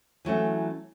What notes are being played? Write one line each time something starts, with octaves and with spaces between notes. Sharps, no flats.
E3 F#3 A3 C#4